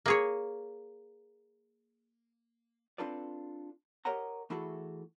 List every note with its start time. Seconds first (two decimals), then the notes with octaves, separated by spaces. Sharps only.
0.06 A#3 G#4 C#5
2.98 C4 D4 F4 A4 B4 D5
4.05 G4 A#4 C#5 D#5 F#5 A#5
4.50 E3 A3 E4 F#4 G#4 A4